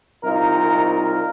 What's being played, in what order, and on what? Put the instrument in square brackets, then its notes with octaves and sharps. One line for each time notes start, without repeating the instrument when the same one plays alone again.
[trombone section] C2 D#4 F4 A#4